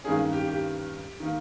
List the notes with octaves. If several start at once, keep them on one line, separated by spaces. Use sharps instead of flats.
G2 D#3 A#3 C#4 G#4
G4
G4
D#3 A#3